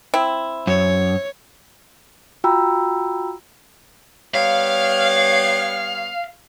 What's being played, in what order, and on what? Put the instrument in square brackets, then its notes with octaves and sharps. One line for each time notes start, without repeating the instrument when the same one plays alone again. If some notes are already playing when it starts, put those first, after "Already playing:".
[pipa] C4 E4
[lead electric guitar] F#2 [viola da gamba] C#5
[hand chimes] F4 F#4 G5 A#5 B5 E6
[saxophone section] G3 B3 C#5 [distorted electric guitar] F5